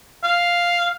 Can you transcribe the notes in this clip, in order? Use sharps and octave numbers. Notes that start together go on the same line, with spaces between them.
F5